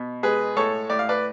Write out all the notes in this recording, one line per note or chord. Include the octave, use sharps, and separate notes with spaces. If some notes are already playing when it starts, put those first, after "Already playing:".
Already playing: B2
G#3 G#4 B4
A2 A4 C#5
A2 D5
F5
B4 D5